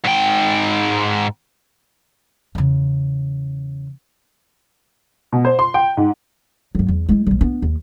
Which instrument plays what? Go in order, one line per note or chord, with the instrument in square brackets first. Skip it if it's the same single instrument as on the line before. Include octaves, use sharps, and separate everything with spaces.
[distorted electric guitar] G#2 G5
[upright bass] E2 C#3
[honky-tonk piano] B2
C5
C6
G5
G#2
[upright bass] G2 F#3
E2
G#3 E4
A#1 G3
B3 D4
D#2